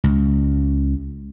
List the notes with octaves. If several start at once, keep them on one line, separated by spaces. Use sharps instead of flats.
C#2